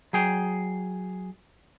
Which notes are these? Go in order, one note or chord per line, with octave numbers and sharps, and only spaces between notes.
F#3 G#4 G5